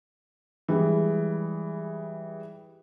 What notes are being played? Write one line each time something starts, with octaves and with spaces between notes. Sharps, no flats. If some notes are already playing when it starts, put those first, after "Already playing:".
E3 G3 G#3